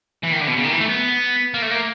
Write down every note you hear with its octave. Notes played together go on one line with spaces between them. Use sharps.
E3
D#3
D3
B2
C#3
D#3
E3
A3
B3
A#3
A3
A#3